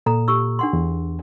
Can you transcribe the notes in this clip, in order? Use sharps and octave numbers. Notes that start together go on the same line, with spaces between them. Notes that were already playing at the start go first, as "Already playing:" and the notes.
A#2 A4 A#5
G4 C#6 E6
D4 F#5 C6
E2